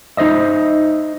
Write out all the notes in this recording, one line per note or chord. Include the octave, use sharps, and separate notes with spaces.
D#4 E4 C5 D#5 E5